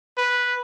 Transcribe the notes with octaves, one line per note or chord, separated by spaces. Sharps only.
B4